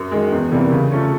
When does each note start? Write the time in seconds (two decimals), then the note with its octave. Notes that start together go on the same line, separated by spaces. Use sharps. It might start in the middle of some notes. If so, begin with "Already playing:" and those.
Already playing: F#2
0.11 D#3 G#3
0.32 E2
0.52 C3 E3 G3 A#3
0.72 C#3
0.92 F3 A3 C#4